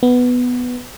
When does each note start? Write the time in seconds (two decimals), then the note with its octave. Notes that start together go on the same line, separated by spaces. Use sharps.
0.03 B3